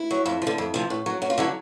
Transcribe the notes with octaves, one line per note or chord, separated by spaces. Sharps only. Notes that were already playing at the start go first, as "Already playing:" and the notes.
Already playing: E4
F#3
F2
F3
D3
F2
C3 F3
A2
F#3
F#2 F#4
F4
D3 F#3 E4